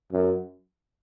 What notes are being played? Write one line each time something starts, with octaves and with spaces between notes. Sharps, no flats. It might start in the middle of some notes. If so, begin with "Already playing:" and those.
F#2